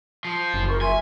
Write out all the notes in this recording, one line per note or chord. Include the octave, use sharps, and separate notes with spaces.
F3
F#1
A#4 C#6
E5 G#5 C6